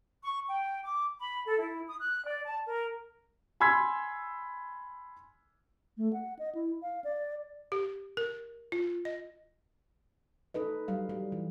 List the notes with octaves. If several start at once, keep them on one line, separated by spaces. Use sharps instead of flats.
C#6
G5
D6
B5
A4
E4
D#6
F#6
D5
A5
A#4
G#5 B5 C6 E6 G#6 B6
A3
F#5
D#5
E4
F5
D5
G4
A#4
F4
D#5
D#4 A4 B4 D#5
F#3 G3 F5
G3
E3